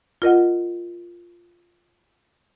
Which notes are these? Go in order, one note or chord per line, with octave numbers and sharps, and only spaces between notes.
F4 A#4 D#5 F#5